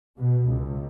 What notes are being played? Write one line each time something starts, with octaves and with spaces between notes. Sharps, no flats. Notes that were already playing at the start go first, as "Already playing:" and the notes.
B2
C#2